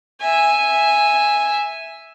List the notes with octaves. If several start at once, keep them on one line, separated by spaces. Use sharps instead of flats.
E5 G#5